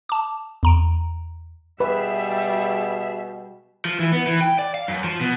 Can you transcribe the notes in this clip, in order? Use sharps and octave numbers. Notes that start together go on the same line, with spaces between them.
A5 D6
E2 A#5 D7
B2 G3 G#4 B4 E5
F3
E3
B3
E3
G5
D5
F5
F#2
F3
B2